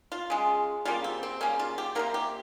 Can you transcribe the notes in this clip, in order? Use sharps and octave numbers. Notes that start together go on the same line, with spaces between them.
F4
C#3 G#3
C#3 G3 A#3 F4
C4
C4
C#3 G3 A#3 C#4
F4
G4
C3 D#3 A#3 A#4
G4